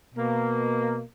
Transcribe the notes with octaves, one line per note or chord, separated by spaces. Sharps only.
B2 A#3